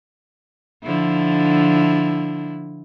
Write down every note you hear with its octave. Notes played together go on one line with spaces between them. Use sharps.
D3 F3 E4